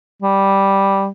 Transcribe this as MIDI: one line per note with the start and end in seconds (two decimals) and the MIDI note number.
0.22 1.08 55